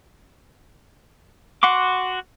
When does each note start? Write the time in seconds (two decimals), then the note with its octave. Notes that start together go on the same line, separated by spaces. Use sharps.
1.63 F#4 F#5 C6 D6